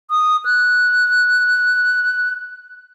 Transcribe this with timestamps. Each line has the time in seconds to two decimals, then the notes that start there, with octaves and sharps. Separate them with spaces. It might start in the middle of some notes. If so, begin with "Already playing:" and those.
0.11 D#6
0.45 F#6